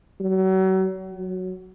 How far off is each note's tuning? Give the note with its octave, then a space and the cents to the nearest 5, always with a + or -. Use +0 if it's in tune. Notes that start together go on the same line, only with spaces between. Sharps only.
F#3 +35
F#3 +0